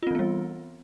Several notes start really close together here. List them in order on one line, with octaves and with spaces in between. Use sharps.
F4 C4 E3 B3 G3